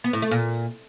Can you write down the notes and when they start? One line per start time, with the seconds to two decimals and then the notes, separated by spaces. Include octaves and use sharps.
0.04 B3
0.13 A2
0.22 A3
0.31 A#2